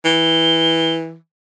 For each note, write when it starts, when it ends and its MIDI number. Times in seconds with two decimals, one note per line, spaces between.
0.05 1.16 52
0.05 0.93 103